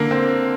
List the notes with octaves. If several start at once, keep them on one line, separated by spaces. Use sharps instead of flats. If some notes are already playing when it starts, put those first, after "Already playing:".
Already playing: D3 A#3
C4